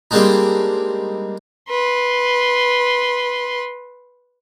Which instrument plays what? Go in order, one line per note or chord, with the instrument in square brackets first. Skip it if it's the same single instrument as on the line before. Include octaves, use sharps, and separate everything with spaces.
[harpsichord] G3 G#3 A#3 C4 D4 D#4
[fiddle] B4 C6